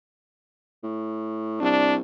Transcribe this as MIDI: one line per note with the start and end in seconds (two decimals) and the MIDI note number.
0.83 1.60 45
1.61 2.00 36
1.61 1.95 62